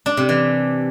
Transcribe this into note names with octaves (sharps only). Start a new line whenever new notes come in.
D4
C3
E3